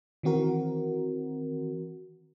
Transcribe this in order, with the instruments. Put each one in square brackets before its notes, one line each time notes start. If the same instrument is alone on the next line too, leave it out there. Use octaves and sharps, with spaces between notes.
[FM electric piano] D#3 E3 C4 F#4 A#4